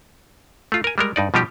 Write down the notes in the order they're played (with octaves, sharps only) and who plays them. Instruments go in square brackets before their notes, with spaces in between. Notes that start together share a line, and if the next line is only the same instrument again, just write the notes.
[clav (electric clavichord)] A3 F4
A#4 G#5
G3 G#3 A#4
G2 D#4 D5
B2 F3 G3 D#4 G4